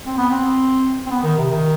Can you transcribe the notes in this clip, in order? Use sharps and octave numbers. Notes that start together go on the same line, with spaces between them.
C4
B3
C4
C4
B3
D#3
C3
D#3